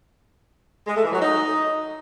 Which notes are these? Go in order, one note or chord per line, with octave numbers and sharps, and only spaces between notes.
G#3
A3
E3
F#3
D#4